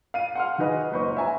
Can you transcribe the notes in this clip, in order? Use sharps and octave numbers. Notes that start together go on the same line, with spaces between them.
F5 D#7
F#5 C6 F6
D#3 F#4 G#4 B4 D#5
F#1 C#2 B4 C5 D#5 C#6
E5 G#5 A#5